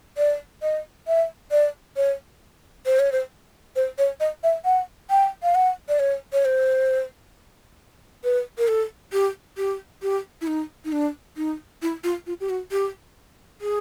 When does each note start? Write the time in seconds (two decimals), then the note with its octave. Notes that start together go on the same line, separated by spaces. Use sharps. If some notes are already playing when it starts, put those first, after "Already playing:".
0.17 D5
0.62 D#5
1.08 E5
1.51 D5
1.96 C#5
2.86 C5
2.99 C#5
3.12 C5
3.76 C5
3.98 C#5
4.20 D#5
4.43 E5
4.65 F#5
5.10 G5
5.43 F5
5.55 F#5
5.89 D5
5.99 C#5
6.33 C#5
6.45 C5
8.24 B4
8.58 A#4
8.68 A4
9.13 G4
9.57 G4
10.02 G4
10.41 E4
10.47 D#4
10.85 D#4
10.92 D4
11.37 D#4
11.82 E4
12.04 F4
12.27 F4
12.40 G4
12.50 F#4
12.72 G4
13.61 G#4